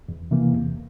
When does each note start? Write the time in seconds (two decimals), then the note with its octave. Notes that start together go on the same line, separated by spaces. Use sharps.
0.09 E2
0.31 C3 E3 A#3
0.53 E2